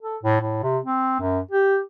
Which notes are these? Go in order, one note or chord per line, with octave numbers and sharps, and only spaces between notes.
A4
A2
A2
C3
C4
F#2
G4